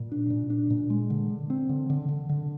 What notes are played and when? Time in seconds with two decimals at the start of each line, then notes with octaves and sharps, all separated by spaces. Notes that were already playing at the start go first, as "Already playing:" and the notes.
Already playing: A#2
0.12 D4
0.30 A#2
0.50 D4
0.70 A#2
0.90 G#3
1.10 D3
1.30 D3
1.50 C4
1.69 D3
1.90 D3
2.09 D3
2.29 D3